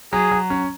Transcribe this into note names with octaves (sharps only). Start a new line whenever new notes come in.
F#3 G#4
F#3
C#4